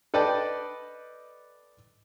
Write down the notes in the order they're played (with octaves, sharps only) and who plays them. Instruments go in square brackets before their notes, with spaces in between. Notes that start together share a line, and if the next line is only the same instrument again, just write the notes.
[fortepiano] A4 B4 D5 D#5 G5 A5